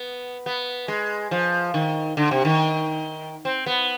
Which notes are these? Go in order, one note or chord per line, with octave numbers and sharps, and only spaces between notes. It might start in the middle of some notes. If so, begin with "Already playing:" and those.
Already playing: B3
B3
G#3
F3
D#3
D3
C3
D#3
C4
B3